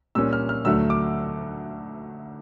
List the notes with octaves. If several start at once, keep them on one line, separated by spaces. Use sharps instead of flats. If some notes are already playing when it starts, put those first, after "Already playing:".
A#2 G3 A#3 C#4 E6
F6
F6
D2 D3 F#3 A3 E6
D6